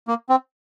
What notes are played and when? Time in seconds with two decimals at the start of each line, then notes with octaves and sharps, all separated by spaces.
0.08 A#3
0.29 C4